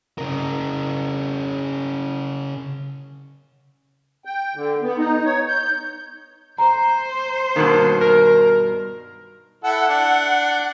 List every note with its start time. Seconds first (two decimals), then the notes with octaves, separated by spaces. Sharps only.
0.18 C#3 A#4
4.25 G5
4.55 D3
4.82 B3
4.98 D#4
5.25 C#5
5.48 G6
6.58 C5 A#5
7.56 G2 B2 D#3 A#3
8.01 A#4
9.64 E4 A4 F#5
9.88 D4